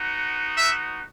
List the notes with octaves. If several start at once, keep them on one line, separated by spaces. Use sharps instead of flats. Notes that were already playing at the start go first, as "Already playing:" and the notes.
Already playing: B3 D#4 F#4
E5